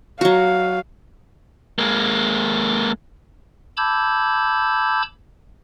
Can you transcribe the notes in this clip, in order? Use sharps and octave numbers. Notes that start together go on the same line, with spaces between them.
F#3 F#4 F5
G#3 A#3
A5 B5 D6 E6 G6 G#6